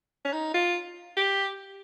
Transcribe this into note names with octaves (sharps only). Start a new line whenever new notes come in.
C#4
D#4
F4
G4